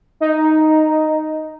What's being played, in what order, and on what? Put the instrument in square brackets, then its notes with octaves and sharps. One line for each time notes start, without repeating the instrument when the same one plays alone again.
[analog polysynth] D#4